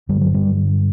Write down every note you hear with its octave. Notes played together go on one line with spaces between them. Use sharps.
G2 D3 G3
F#3
G3